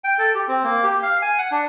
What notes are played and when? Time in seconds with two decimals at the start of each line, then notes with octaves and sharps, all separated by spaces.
0.04 G5
0.19 A4
0.35 G4
0.48 C4
0.64 A#3
0.83 G4
1.03 F5
1.22 G#5
1.38 F#5
1.51 D4